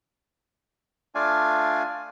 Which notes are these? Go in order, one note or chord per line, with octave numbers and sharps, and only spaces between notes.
A3 D4 F4 D5 F5 G#5